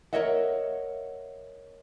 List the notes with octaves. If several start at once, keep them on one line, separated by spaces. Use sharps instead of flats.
A#4 C5 C#5 D#5 E5 F#5